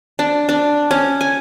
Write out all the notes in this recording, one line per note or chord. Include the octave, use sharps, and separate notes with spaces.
D4
D4
C#4
G#5